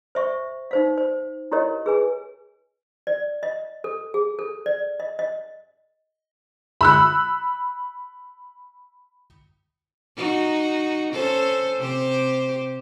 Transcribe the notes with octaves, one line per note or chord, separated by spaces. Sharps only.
C5 E5 C#6
D#4 C5 F5
C5
E4 G4 A#4 C#5 D#5
G#4 B4 G#5
D5
D#5
A4
G#4
A4
D5
D#5
D#5
B5 E6 F#6
D#4 F#4
C#4 A4 C5
C3 G4 C5